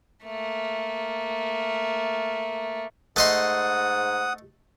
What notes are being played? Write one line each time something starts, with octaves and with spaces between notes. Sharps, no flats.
A3 A#3
G#2 A3 D#5 F#5 C6 D#6